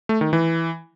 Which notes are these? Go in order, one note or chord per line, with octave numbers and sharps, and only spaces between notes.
A3
D#3
E3